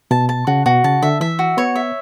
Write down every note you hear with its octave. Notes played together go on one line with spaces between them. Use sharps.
B2 A5
A5
C#3 F#4
B2 F#4
C#3 A5
D3 E5
E3 E5
F#4
B3 C#5
E5